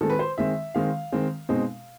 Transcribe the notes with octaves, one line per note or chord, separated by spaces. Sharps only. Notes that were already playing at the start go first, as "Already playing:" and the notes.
D#3 G#3 C4 A4
B4
C5
D#3 G#3 C4 E5
D#3 G#3 C4 F5
D#3 G#3 C4
B2 G#3 C4 D#4